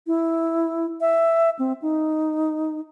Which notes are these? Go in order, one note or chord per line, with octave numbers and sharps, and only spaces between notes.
E4
E5
C4
D#4